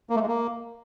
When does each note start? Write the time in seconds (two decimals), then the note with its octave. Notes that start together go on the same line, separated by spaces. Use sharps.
0.10 A#3
0.16 A3
0.22 G#3
0.28 A#3